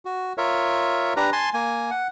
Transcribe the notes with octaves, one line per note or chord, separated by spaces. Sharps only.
F#4
F4 A#4 C#5 E5
D4 G4 B4 A#5
G#5 A5 C6
A#3 G#5
F#5